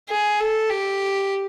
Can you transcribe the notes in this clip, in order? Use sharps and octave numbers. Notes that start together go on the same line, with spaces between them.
G#4
A4
G4